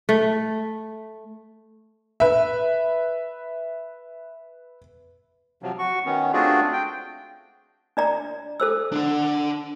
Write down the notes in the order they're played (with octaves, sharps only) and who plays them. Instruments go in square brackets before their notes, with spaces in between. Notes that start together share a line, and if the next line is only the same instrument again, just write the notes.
[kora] A3
[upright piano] B4 E5
[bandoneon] C3 F3 F#3
F#4 C#6
D#3 B3 C#4
A3 C4 D4 F4 F#4 G#4
G5
[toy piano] D4 D5 A#5
A4 C5 E6
[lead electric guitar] D4 F#5